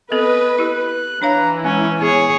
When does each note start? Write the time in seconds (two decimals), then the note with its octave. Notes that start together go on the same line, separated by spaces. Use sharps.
0.12 B3 C4 A4 B4 D#5
0.59 E4 G4 F#6
1.22 E3 D4 C#5 F5 A#5
1.65 G#3 C#4 G#5
2.01 B3 G#4 C#5